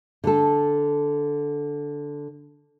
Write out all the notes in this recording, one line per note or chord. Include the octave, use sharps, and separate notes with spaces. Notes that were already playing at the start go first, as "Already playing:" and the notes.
D3 A4